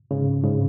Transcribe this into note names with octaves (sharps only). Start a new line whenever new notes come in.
G#2 C#3
G#2 C#3